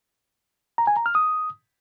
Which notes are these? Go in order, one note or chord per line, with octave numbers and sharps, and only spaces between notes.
A#5
G#5
A#5
F6
D#6